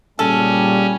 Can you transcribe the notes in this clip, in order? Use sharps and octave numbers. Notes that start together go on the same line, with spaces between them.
A#2 C#3 G3 C#4 A4